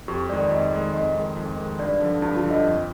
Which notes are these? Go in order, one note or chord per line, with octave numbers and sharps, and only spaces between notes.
F2 G4
D#3 G#3 D5
F2 D#5
D#3 G#3
F2 D#5
D#3 G#3
F2
D#3 G#3
G2 D5
D3 F3
G2 D#4
F4
D3 F3
D#5
F2